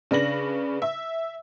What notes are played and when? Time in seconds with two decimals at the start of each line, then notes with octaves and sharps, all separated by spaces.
0.11 C#3 D4 B4 A#6 F#7
0.82 E5